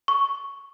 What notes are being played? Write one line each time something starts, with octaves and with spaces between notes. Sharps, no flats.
C#6